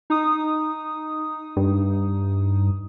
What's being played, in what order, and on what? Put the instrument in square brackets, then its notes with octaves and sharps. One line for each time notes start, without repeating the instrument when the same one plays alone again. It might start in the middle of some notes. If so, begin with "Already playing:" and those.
[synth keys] D#4 D#6
[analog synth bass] G2